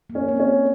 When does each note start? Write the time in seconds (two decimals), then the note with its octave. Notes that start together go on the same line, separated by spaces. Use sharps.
0.10 A#3
0.15 C#4
0.28 C4
0.40 C#4